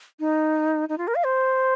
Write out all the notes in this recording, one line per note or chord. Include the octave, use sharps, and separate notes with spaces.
D#4
D#4
F4
A#4
F5
C5